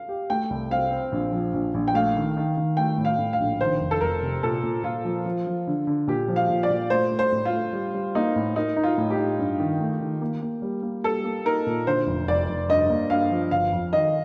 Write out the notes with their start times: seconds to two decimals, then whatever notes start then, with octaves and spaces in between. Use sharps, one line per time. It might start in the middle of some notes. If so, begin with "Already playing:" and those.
Already playing: F5
0.09 G4
0.30 A3 G5
0.50 C2
0.70 C4 F5
0.91 C4
1.12 A#1
1.32 F3
1.54 A#1
1.74 A#1
1.88 G5
1.94 A3 F5
2.15 D#3
2.37 D#3
2.57 D#3
2.77 A3 G5
2.98 A2
3.05 F5
3.19 A2
3.33 F5
3.40 A#1
3.61 D#3 C5
3.80 F1
3.91 A4
4.01 F1 A#4
4.22 C3
4.43 A#2 A4
4.63 A#2
4.84 A#2 F4
5.05 F3
5.26 F3
5.47 F3
5.67 D3
5.87 D3
6.07 A#2 G4
6.28 F3
6.36 F5
6.49 A#2
6.63 D5
6.70 A#2
6.90 A3 C5
7.11 A3
7.19 C5
7.32 A2
7.45 F4
7.53 A3
7.73 G3
7.94 G3
8.15 A#3 D#4
8.36 A2
8.56 D#4 A#4
8.76 D#4
8.83 F4
8.98 A2
9.10 G4
9.18 D#4
9.39 G2
9.60 D#3
9.80 A3
10.01 D#3
10.22 A#3
10.42 A#3
10.62 G3
10.83 A#3
11.04 G3 A4
11.24 A#3
11.45 D#4 A#4
11.66 A#2
11.87 D3 C5
12.07 F1
12.27 F1 D5
12.49 F1
12.69 G2 D#5
12.90 A#3
13.10 G2 F5
13.31 F3
13.51 G1 F5
13.72 F2
13.93 D#3 D#5